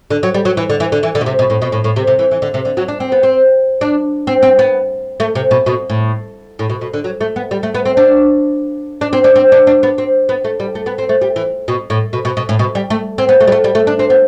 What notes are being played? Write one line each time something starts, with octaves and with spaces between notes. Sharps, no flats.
D3
F#3
G3
F#3
E3
D3
E3
D3
E3
D3
B2
C3
B2
A2
B2
A2
A2
C3
C3
E3
E3
D3
C3
D3
F#3
D4
C4
B3
C4
D4
C4
C4
B3
A3
C3
B2
B2
A2
A2
B2
B2
D3
F#3
A3
B3
G3
A3
B3
C4
D4
D4
C4
D4
C4
D4
D4
B3
C4
B3
A3
G3
A3
B3
C4
A3
G3
E3
B2
A2
B2
B2
B2
A2
B2
G3
A3
C4
B3
A3
G3
A3
G3
A3
D4
C4
B3